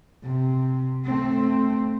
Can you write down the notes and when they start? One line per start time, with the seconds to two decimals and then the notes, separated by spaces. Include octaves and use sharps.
0.23 C3
1.05 A3 C4